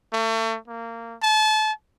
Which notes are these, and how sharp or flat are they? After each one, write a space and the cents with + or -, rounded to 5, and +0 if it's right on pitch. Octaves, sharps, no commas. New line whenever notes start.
A3 +35
A#3 -20
A5 -30